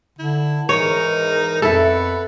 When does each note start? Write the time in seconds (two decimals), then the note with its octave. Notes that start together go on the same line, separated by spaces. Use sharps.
0.19 D3 E4
0.69 E2 G#2 E3 D#4 A#4 C#5
1.62 F2 B3 E4 A4